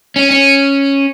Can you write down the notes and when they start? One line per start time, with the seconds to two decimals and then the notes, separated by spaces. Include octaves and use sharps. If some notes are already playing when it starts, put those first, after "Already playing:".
0.16 C#4
0.30 C#4